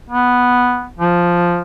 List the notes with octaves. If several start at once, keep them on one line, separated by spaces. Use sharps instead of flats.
B3
F3